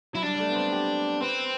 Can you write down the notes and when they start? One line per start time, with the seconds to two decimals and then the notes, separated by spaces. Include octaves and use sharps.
0.13 F#3 E4
0.23 G3 D4
0.35 G3
0.40 A3
0.49 B3
0.55 C4
0.72 G4
1.21 C4 B4